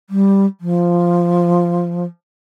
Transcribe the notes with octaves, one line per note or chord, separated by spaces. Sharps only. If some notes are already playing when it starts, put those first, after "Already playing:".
G3
F3